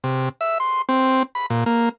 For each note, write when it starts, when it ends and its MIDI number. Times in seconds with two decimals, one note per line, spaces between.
0.04 0.29 48
0.41 0.58 76
0.60 0.82 84
0.89 1.23 60
1.35 1.46 83
1.50 1.64 46
1.66 1.89 58